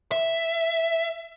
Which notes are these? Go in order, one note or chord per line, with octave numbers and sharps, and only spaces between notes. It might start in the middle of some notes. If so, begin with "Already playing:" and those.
E5